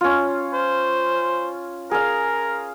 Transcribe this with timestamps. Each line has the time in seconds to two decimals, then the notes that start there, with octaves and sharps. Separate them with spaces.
0.01 C#4 F4
0.53 C5
1.91 G#4 A#4 F5